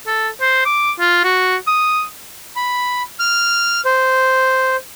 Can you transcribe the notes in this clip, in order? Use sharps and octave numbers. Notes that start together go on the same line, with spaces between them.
A4
C5
D6
F4
F#4
D#6
B5
F6
C5